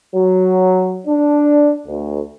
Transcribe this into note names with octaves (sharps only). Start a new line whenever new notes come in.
F#3
D4
D2